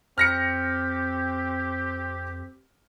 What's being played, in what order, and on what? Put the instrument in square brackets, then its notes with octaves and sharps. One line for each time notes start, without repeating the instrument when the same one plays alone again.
[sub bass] F2 [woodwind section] C4 G4 [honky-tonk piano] F6 A#6 C#7